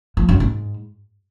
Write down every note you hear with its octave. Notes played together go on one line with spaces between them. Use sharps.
F3
F#2
G#2